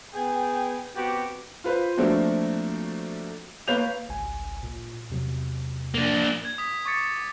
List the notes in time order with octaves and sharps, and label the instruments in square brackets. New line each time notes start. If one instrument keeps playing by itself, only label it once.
[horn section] B3 G#4 G5
B3 C4 F#4 G4
[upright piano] F4 B4 C5
F3 A3 A#3 C4 D4 F#4
A#3 B4 C#5 F5 G6 F7
[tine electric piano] G#1 C#2 G#5
A#2
E2 C3 F#3
[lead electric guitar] A#3 D4
[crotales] G#6
D#6 B6
C#6 D6 G#6 A6 C#7